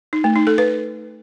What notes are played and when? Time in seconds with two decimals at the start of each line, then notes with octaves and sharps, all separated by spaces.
0.13 D#4
0.24 A3
0.35 D#4
0.47 A4
0.58 B4